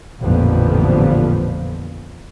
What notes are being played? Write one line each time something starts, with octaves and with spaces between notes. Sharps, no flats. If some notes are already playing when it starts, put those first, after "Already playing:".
A1 F2 A#2 D3 F3 B3